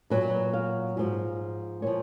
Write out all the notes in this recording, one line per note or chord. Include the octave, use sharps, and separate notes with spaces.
A#2 F#3 B4
F5
G#2 F3
A#2 F3 C#5